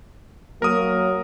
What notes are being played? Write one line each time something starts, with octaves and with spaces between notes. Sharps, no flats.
F#3 A#3 A#4 D#6